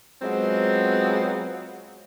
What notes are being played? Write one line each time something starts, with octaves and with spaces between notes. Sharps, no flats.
F#3 G#3 B3 C4 F4